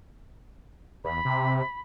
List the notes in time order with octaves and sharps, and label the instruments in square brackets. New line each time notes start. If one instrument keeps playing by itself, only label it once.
[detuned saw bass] E2 [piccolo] B5
[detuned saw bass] C3